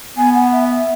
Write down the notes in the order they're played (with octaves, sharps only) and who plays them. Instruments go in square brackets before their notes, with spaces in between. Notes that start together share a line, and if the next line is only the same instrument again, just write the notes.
[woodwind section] B3 [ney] G#5
[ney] F#5
E5
E5